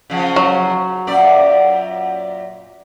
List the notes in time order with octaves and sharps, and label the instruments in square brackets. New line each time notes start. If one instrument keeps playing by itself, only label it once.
[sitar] C#3 F3 C#4
[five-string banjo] F#3
[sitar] F#2 A#2 D5